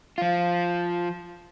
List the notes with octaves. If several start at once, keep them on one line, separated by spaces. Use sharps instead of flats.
F3 F4